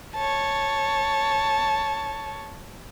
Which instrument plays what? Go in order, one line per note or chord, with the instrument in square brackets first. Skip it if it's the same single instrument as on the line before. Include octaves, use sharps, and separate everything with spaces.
[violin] C#5 A5